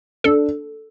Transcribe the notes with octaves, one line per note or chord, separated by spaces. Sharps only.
D4 A4